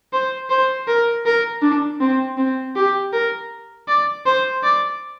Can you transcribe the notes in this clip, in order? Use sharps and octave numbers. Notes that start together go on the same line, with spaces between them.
C5
C5
A#4
A#4
D4
C4
C4
G4
A#4
D5
C5
D5